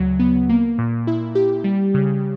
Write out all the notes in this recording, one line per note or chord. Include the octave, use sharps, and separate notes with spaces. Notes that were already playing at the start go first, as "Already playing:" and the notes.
Already playing: D2 C#3 F#3
B3
A#3
A#2
E4
G4
G3
C#3